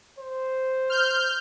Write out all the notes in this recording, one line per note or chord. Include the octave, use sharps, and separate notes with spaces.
C5
F6 G6